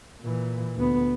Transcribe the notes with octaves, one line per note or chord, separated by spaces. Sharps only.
A#2 E3
D2 B3